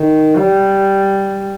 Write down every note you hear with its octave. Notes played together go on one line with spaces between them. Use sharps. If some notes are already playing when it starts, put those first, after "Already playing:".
Already playing: D#3
G3